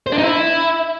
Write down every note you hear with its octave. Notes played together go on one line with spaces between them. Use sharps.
C5
D4
D#4
E4